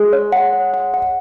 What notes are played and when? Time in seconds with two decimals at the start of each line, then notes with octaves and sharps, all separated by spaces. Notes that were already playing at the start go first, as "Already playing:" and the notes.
Already playing: G#3 G#4
0.13 C#5
0.32 F#5
0.53 C#5
0.74 F#5
0.94 F#5